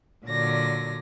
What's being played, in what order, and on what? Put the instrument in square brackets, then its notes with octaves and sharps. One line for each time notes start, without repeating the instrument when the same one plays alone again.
[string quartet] A#2 D3 F#3 D5 A#6